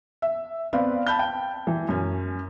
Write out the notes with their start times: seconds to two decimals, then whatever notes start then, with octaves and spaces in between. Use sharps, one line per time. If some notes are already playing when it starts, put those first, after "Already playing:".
0.22 E5
0.73 B3 C4 B4 D5 F5 B5
1.07 A5 B5 G6
1.19 G5
1.67 E3
1.88 F#2 C#4